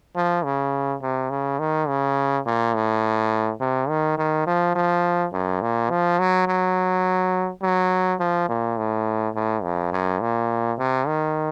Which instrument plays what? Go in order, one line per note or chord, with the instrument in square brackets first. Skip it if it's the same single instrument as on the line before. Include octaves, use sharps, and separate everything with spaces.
[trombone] F3
C#3
C3
C#3
D#3
C#3
A#2
A2
C3
D#3
D#3
F3
F3
F#2
A#2
F3
F#3
F#3
F#3
F3
A#2
A2
A2
F2
F#2
A#2
C3
D#3